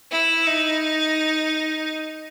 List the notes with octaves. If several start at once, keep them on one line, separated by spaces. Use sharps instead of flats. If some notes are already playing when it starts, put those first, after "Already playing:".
E4
D#4